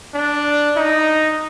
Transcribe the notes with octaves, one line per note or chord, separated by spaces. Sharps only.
D4
D#4